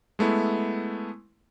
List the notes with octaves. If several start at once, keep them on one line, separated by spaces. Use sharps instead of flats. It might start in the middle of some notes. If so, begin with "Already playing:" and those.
G#3 A3 B3 E4